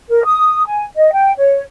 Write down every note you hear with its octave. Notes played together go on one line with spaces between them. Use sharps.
A#4
D#6
G#5
D#5
G5
C#5